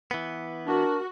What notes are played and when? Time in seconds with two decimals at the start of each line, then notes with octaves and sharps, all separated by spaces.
0.11 E3 B3
0.67 D4 F#4 A#4